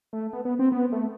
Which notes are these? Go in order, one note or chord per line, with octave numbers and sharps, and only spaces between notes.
A3
B3
B3
C4
B3
A3